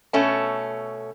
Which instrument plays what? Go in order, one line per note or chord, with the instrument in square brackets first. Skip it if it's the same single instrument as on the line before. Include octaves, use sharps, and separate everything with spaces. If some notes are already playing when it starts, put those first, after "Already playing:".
[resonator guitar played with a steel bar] B2 A3 C#4 A5